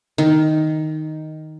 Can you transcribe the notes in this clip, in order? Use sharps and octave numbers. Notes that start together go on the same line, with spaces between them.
D#3